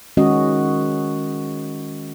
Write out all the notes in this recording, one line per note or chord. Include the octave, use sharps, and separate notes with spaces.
D#3 G#3 C#4 F#4 D#5